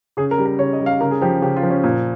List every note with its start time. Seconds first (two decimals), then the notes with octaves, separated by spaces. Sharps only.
0.17 C#3 G#4
0.31 A#4
0.38 G3
0.46 A#4
0.59 C#3 C#5
0.73 D#5
0.79 G3
0.86 F5
1.01 C#3 A#4
1.11 G#4
1.21 F3 G4
1.42 C#3 G4
1.56 F4
1.63 F3
1.70 C#4
1.84 A#2